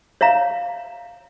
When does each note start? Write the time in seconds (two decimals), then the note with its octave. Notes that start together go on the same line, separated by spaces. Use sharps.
0.21 C#5 E5 F5 A#5